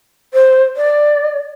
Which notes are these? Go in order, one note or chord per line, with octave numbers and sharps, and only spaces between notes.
C5
D5